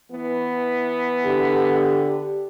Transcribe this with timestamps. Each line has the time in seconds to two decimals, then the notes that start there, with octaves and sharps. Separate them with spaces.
0.11 E3 B3
1.27 D3 G4